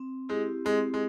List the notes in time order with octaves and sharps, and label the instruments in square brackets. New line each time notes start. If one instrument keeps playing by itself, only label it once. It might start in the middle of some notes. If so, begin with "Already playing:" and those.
Already playing: [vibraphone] C4
[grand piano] G#3 [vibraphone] E4 G4
[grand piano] G#3 [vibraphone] C4
[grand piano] G#3